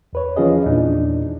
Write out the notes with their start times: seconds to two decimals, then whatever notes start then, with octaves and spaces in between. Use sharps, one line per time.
0.13 E2 B4 C#5
0.37 E3 F3 C#4 F4 G#4 D#5
0.66 E2 A#2 E3 D4 D#4